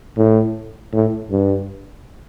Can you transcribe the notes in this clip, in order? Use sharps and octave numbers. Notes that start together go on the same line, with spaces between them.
A2
A2
G2